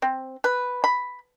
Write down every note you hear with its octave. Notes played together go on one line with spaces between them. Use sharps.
C4
B4
B5